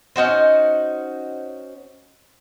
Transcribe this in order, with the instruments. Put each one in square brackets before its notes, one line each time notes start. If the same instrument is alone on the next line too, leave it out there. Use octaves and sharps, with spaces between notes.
[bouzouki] C#4 D#4 F#4 C5